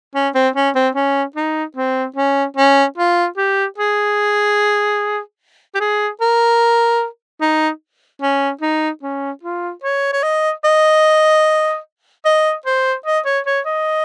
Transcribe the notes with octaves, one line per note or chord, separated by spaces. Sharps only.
C#4
C4
C#4
C4
C#4
D#4
C4
C#4
C#4
F4
G4
G#4
G4
G#4
A#4
D#4
C#4
D#4
C#4
F4
C#5
C#5
D#5
D#5
D#5
C5
D#5
C#5
C#5
D#5